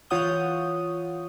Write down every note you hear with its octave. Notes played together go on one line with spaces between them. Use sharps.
E3 F4 C#5 F#5 D#6 G6